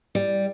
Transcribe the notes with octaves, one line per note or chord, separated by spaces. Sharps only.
G3